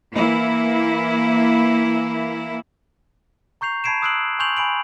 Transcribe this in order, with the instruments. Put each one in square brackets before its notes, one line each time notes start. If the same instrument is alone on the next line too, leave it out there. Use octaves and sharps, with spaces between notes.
[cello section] E3 A#3 E4
[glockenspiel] A#5 C#6 G6 C7 F7
A5 B5 G#6 C7 D7 E7
D#6 E6 F#6 C7 D7 F#7
G#5 C6 C#6 G6 F7 F#7
G#5 B5 D7 F#7